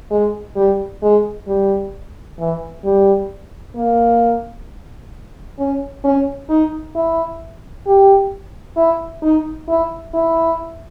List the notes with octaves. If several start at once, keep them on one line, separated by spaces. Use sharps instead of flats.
G#3
G3
G#3
G3
E3
G3
A#3
C#4
C#4
D#4
E4
G4
E4
D#4
E4
E4